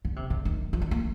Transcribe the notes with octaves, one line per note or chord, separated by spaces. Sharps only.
D3
C3
D3
D#3
F3
D#3
A#3